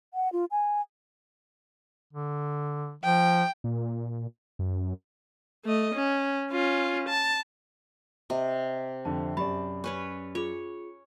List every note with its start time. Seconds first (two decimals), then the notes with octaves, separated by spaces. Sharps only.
0.14 F#5
0.33 F4
0.51 G#5
2.13 D3
3.04 F3 G5
3.64 A#2
4.59 F#2
5.65 A3 D#5
5.95 C#4
6.51 C#4 F4
7.08 A5
8.30 C3 D#5
9.05 F2 D3 A5
9.37 F#2 G4 D5 A5 B5
9.84 C#4 B4 C#5
10.35 F4 G#4 C#5